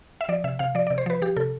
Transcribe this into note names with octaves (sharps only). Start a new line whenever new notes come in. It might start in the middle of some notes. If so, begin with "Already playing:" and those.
E5
F3 D5
C3 E5
C3 F5
F3 D5
C3 D5
C5
F3 B4
F3 G4
C3 A4